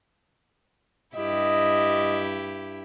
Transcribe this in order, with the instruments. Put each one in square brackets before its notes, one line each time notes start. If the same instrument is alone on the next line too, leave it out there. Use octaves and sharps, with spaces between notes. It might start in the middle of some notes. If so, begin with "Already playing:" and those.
[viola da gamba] G2 E4 G4 [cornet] D#5